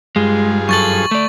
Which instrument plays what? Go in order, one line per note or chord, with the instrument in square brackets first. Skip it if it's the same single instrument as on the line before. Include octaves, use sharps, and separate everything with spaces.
[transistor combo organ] G2 F4 G#4 [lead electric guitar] G#3
[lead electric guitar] F#2 A4 [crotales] C#6 A6 F#7
[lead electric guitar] A3 D5